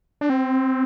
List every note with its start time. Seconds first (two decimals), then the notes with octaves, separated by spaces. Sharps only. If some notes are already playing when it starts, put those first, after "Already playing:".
0.21 D4
0.30 C4